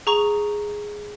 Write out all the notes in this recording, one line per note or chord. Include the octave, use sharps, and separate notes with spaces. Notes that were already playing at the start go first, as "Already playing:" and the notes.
G#4 A#5 C#6